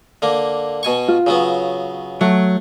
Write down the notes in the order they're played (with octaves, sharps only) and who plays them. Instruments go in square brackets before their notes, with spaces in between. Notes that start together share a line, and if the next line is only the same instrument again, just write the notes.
[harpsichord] D3 A#3
B2 G#5 C#6
[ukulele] F4
[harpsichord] C#3 F#3 B3
[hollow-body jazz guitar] F#3 [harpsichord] A3